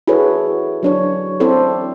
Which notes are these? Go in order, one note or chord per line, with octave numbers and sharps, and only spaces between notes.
E4 F#4 G#4 A4 B4 C#5
F#3 D4 C#5
C4 E4 A4 C5 D5